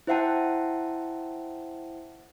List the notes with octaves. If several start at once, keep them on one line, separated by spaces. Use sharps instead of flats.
E4 C5 E5 F#5 G5 A5